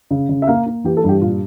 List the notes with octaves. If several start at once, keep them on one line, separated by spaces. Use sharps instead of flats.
C#3
C#3
E5
A#3 F5
A#3
E3 G4
A4
G2 G4
A#2 F4